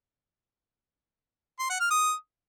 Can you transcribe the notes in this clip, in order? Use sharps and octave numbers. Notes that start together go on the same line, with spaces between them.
C6
F#5
F6
D#6